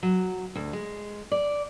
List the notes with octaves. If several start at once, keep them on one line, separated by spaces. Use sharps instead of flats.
F#3
D2
G#3
D5